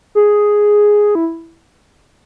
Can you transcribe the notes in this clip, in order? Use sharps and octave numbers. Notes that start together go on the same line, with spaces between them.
G#4
E4